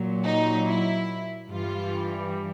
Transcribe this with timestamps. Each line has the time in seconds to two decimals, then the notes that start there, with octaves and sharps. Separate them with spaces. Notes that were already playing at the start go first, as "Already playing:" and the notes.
Already playing: A#2 F#3
0.24 D#4
0.66 E4
1.49 G2 E3 G3 F4